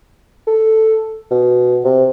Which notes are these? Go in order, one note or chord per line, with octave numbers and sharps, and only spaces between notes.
A4
B2
C3